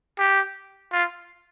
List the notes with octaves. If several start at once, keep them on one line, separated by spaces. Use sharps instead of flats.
G4
F4